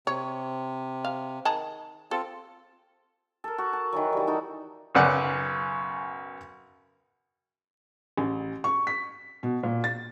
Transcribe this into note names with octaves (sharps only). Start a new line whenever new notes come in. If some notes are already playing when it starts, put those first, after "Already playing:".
C3 C#5
F5
D#3 G#4 A5
C4 F4 A4
A4 A#4
F#4
A5
D#3 E3 F#3
E3 G3
E3 D#4 F#4 A4
B1 F#2 C#3 D5 F#5
A1
C#6
B6
B2
A#2
A6